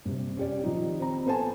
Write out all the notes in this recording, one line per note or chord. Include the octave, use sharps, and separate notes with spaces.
G2 C3
C#4 G4 D5
D#3 F3 D#4
C4 A#5
B3 A4 C5 G#5 A5